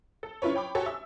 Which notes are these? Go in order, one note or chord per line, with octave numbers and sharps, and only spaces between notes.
A4
C#4 E4 F4 B4 C#5
C#5 G5 B5 D6
F#4 G4 A4 C#5 G#5
E5 E6